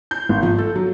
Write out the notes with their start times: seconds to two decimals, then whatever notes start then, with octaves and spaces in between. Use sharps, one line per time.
0.11 G6
0.29 G#1
0.43 F3
0.58 A4
0.76 F#3